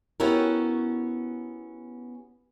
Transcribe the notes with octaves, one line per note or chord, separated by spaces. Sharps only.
B3 C#4 E4 F#4 G4 A#4